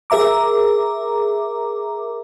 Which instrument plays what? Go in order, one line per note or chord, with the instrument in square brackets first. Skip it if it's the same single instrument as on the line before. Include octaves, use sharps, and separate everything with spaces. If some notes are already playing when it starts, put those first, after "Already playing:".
[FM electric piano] G#4 A#4 E5 A#5 D6